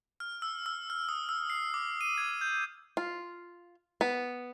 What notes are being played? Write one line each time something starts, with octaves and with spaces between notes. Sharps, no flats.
F6
E6
E6
F6
D#6
E6
C7
D6
D#7
G#6
G6
F4
B3